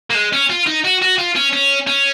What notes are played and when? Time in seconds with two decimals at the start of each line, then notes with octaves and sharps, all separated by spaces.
0.10 A#3
0.15 G#3
0.33 C#4
0.50 F4
0.66 D#4
0.84 F#4
1.02 F#4
1.18 F4
1.35 C#4
1.53 C#4
1.87 C#4